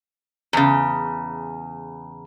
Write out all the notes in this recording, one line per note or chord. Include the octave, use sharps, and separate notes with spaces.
E2 C#3